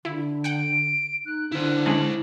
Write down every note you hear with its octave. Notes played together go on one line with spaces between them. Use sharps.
D3 E4
F#5 G5 D7
D#4 F#6
D3 E4 C5
G#3 C#4 D4 F#7